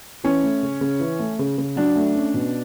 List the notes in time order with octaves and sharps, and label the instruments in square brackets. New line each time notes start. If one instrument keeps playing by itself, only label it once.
[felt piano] E3 [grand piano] C#4
[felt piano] A3
C#3
C#3
E3
A3
C#3
C#3
[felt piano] F#3 [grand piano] D4
[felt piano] A3
C#4
B2